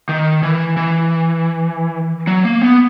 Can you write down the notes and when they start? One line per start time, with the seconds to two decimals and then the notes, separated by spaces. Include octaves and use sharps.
0.09 D#3
0.43 E3
0.77 E3
2.27 F#3
2.45 A#3
2.61 B3